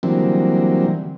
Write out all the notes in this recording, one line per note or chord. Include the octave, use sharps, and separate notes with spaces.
D3 E3 F#3 G3 A#3 C4